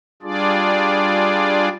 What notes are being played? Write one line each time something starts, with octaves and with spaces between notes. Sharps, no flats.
G3 D4 F4 G#4 D5